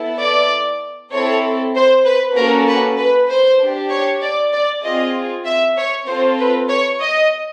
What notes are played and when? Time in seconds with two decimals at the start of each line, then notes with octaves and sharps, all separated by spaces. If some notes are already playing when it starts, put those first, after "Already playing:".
Already playing: B3 E4 A4
0.20 D5
1.12 C4 E4 A4 C#5
1.75 C5
2.05 B4
2.36 A#3 C#4 F#4 A4 A#4
2.68 B4
2.98 B4
3.30 C5
3.61 D4 G4
3.91 C#5
4.22 D5
4.53 D5
4.83 C4 F4 G#4 D#5
5.46 E5
5.77 C#5
6.07 C4 F4 A4 C5
6.39 B4
6.69 C#5
7.01 D#5